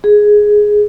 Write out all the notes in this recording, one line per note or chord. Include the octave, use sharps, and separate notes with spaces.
G#4